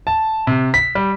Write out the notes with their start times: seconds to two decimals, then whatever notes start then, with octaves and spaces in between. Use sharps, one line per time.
0.07 A5
0.47 C3
0.74 B6
0.95 G3